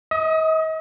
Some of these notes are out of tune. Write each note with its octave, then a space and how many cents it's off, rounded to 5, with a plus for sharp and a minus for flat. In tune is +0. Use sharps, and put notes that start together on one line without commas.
D#5 +40 D#6 +0